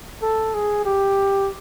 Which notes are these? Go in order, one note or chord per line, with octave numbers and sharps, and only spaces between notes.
A4
G#4
G4